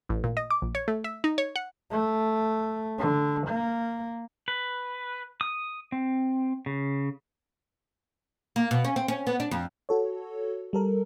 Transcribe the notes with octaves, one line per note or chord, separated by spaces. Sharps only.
A1
A#2
D#5
D6
A#1
C#5
A3
E5
D#4
C#5
F#5
A3
D3
A#3
B4
D#6
C4
C#3
A#3
B2
C#4
C4
C#4
B3
D4
F2
F#4 A4 C#5
G3 A4 A#4